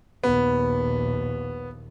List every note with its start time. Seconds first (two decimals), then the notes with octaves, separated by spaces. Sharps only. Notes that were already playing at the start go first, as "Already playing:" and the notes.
0.24 A#1 D#2 B3